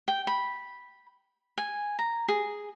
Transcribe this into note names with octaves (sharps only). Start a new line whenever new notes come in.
G5
B5
G#5
A#5
G#4